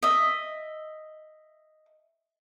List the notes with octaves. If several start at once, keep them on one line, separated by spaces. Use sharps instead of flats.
D#5 E5